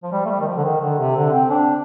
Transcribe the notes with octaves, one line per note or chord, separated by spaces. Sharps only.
F3
G3
A3
G3
D#3
F3
D3
D#3
D3
C3
D3
C4
D4